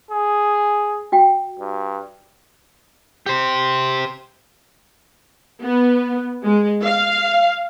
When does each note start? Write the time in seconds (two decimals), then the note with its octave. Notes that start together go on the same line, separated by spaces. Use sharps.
0.11 G#4
1.12 F#4 G5
1.60 G2
3.26 G4 C5
5.61 B3
6.44 G#3
6.82 F5